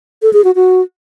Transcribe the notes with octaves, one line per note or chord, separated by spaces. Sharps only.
A4
G#4
F#4
F#4